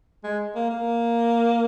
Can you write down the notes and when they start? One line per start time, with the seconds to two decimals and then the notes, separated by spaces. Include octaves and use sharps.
0.24 G#3
0.55 A#3
0.70 A#3